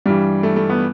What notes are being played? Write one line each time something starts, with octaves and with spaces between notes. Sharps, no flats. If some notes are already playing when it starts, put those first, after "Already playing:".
G2 E3 G3
A3
A3
B3